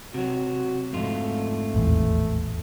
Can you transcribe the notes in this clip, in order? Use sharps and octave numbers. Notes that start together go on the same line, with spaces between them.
C3 F#3 F#4
F2 G#2 A3 F4
D#1 A1 E2